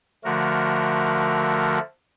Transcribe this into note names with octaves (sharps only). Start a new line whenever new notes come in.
D3 F3 A3 F#4 A#4